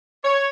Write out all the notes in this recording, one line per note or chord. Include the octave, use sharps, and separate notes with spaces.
C#5